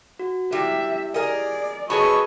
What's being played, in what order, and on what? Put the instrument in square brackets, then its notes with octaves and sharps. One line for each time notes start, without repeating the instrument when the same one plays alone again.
[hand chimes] F#4
[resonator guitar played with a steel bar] G3 [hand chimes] E4 G4 [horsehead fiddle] E5
[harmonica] G#4 [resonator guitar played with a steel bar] A#4 D#5 [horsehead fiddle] D5
[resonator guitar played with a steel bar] F#4 G#4 B4 [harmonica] A4 C#5 C#6 [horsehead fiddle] D#5 [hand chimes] B5